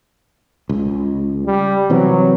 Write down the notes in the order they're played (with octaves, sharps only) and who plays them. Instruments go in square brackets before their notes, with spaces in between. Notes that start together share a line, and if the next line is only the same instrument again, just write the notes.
[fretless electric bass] C#2
[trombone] G3
[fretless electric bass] C3 E3 C4 [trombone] F#3